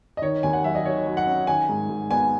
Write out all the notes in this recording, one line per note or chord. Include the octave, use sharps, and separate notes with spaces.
D#5
D#3 C#5
D#2 G#5
F#5
F#3 E5
D#5
D#3 C#5
F#3
F#5
C#4
D#3 G#5
G#2
G#2
B3 G#5